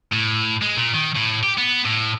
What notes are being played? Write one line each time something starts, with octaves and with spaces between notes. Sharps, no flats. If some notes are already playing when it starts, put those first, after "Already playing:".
A2
G#3
A#2
D#3
A2
G4
B3
A2